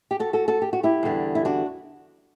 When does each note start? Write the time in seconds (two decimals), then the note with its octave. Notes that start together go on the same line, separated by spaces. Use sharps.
0.11 G4
0.20 F#4 A4
0.33 F#4 A4
0.48 F#4 A4
0.62 G4
0.73 F#4
0.83 E4 G4
1.03 E2 D3 G3
1.35 E4
1.45 D4 F#4